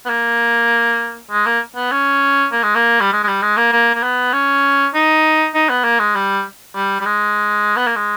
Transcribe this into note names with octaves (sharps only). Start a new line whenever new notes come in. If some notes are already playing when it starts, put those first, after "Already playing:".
B3
A#3
G#3
A#3
B3
C#4
A#3
G#3
A#3
G3
G#3
G#3
G3
G#3
A#3
A#3
A#3
B3
C#4
D#4
D#4
B3
A#3
G#3
G3
G3
G3
G#3
B3
A#3
G#3